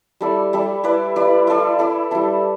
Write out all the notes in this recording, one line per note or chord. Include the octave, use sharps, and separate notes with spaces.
G3 E4 A4 D5
G3 E4 A4 D5
E4 B4 D5
E4 B4 D5
E4 A4 D5
E4 A4 D5
G3 E4 A4